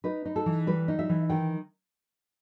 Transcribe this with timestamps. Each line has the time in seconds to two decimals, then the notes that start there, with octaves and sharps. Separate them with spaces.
0.04 D#4 B4
0.25 D#4
0.36 A4
0.46 E3
0.67 G3 B4
0.88 D#4
0.99 E5
1.09 E3
1.29 D#3 G5